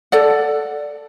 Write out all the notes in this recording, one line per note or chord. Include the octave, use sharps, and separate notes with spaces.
A4 D5 F#5